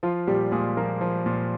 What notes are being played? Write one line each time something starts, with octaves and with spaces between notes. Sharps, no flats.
F3 F4
A#2 G3 G4
A#2 G#3 G#4
F3 A#3 A#4
F3
A#2